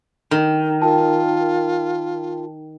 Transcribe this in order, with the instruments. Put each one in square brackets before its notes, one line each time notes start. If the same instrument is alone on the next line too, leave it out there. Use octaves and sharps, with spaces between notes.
[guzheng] D#3
[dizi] F4 [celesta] A#4 G5 A5